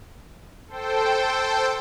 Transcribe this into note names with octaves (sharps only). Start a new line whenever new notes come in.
A4 C5 G5